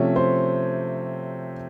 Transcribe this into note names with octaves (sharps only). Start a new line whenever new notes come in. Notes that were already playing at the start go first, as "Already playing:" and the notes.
Already playing: C3 F3 A3 C#4 C#5
C5